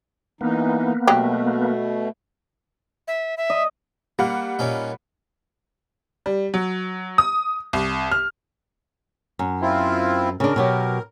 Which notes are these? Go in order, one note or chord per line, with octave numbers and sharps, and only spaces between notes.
E3 A#3 B3 D#4
B2 F#3 A3 G4
E5
E5
D#5
G3 A#3 F5 F#5
A#2 C#4 D#4
G3
F#3
D#6
C2
F6
F#2
C4 E4 F4
C#3 D4 A#4
B2 F#3 G4